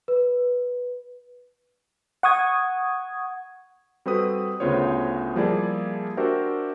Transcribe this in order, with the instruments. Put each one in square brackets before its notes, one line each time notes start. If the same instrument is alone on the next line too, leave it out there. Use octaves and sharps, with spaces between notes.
[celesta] B4
[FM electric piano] F#5 C#6 D#6 G#6
[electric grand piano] G3 C4 F#4 A4 B4 D#6
D2 C#3 B3 F4 C5 C#5
F3 G3 A#3 E4 G#4 D5
D4 F#4 G4 A#4 C5 E5